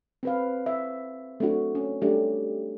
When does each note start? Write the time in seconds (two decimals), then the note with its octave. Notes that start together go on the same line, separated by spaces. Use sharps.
0.23 C4 B4 F5
0.66 E5
1.40 A3 C4 D4 F#4
1.75 C#4
2.02 G3 A3 D4 G4